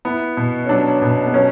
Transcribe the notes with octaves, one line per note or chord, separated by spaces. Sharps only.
B3 E4
B2
C#4
F#3 D4
B2
B3
F#3 C#4